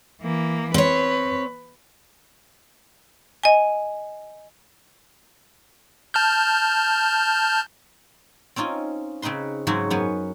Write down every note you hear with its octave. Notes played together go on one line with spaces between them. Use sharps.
E3 A#3
C4 B4 C#5
D#5 G#5
A5 F6 G6
C4 C#4 D#4 F4
C#3 C4 D#4 B4 C6
G#2 C#3 F#3 C4 C#4 F#4
F#2 B3 C#4